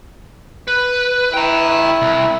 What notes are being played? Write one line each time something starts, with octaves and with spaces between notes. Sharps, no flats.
B4
E4 G5 A#5
C2